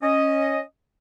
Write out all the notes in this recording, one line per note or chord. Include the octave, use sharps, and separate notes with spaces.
C#4 D#5